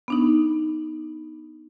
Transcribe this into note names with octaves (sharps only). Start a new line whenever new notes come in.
B3 D4 D#4